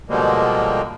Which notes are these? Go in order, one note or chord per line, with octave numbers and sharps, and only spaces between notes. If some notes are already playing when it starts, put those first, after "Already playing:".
B2 D3 F3 G3 G#3 A#3